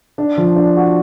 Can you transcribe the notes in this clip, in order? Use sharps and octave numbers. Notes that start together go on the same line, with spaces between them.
D4
F3
D4
F#4